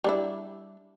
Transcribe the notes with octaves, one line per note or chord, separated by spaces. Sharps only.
G3 D4 E4